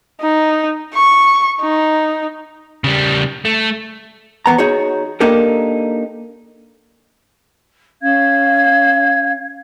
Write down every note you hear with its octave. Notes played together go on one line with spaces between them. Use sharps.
D#4
C#6
D#4
C#3 G3
A3
E2 B3 A#5
D#4 F#4 G#4 C#5
A#3 D4 D#4 G4 A4 A#4
C#4 F5 G#6